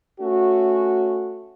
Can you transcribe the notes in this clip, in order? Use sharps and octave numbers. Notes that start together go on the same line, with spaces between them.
A3 C#4 F#4